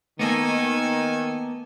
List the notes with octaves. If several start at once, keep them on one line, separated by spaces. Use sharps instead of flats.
D#3 A#3 B3 A4 G#5